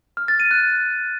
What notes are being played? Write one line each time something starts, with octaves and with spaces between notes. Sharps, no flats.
F6
A6
D#7
F#6